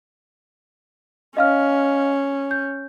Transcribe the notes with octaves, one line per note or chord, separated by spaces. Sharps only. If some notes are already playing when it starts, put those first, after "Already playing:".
C#4 D#5 F5 F6
G6